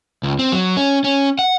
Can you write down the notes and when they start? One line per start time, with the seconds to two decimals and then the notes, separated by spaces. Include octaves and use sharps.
0.23 C#2
0.39 C4
0.52 F#3
0.77 C#4
1.04 C#4
1.39 F#5